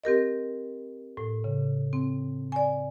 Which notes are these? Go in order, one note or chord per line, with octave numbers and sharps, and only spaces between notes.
C4 G4 A#4 D#5
A2
C#3
C4
D5 G#5